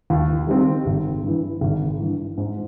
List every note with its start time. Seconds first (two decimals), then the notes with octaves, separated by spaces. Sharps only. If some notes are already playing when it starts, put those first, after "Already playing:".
0.10 D#2
0.47 D#3 G3 C4
0.86 G#1
1.23 G2 E3
1.61 G#1
1.99 G2 E3
2.38 G#2